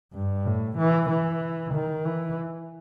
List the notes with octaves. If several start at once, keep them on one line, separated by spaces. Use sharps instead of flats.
G2
A2
E3
E3
D#3
E3